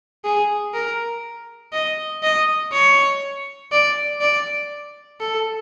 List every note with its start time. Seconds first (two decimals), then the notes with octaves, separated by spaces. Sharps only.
0.24 G#4
0.74 A#4
1.73 D#5
2.23 D#5
2.73 C#5
3.72 D5
4.21 D5
5.21 A4